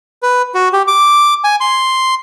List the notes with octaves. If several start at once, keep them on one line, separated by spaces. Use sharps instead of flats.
B4
F#4
G4
D6
G#5
C6